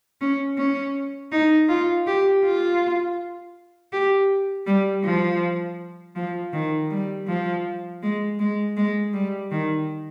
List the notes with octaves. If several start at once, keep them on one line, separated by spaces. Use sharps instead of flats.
C#4
C#4
D#4
F4
G4
F4
G4
G3
F3
F3
D#3
G3
F3
G#3
G#3
G#3
G3
D#3